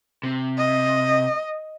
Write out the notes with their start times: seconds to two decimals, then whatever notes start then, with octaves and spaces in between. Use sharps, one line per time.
0.23 C3
0.58 D#5